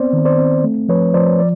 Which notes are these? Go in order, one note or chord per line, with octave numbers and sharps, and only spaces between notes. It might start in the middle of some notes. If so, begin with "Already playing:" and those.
Already playing: B3 C4 C5 D5
D#3
C5 D5
C4
A3
F3 B4 C#5
F3 C5 D5
F3 D5